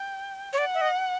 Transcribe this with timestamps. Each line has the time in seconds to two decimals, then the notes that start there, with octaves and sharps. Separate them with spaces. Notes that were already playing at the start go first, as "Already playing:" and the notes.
Already playing: G5
0.53 C#5
0.58 D5 F#5
0.74 E5
0.81 D#5